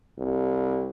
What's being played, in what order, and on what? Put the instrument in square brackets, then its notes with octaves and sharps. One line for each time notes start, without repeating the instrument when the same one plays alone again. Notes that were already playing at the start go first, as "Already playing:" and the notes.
[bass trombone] C2